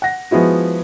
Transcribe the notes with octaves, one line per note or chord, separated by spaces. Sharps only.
F#5 A#6
F3 G#3 B3 E4 F#4